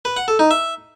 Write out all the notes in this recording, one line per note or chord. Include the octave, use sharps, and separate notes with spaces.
B4
F#5
A4
D#4
E5